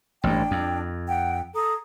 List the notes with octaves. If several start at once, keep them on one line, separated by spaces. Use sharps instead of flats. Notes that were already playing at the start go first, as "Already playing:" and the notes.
A1 G2 D4 G5
F2
F#5 G5
A4 A#5 D#6